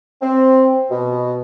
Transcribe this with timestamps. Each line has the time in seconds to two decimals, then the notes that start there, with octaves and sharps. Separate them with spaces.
0.21 C4
0.89 B2